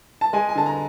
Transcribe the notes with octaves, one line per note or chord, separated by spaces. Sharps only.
A5
G#3 G#5
G#5
D3 A5
A#5